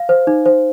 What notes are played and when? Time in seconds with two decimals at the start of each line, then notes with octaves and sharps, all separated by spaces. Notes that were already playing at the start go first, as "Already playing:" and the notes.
Already playing: F5
0.09 C5
0.27 D#4
0.46 C5